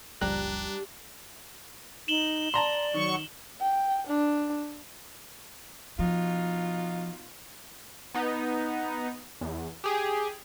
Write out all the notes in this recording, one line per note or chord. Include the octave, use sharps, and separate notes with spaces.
F#1 C#2 F3 G3 D4 G4 A#5 F#6
D#4 E7 F#7 G7
D5 A5 A#5 C6
D#3 F#3 C#6
G5
D4
B2 F3 D#4 F4
B3 D#4
E2
G4 G#4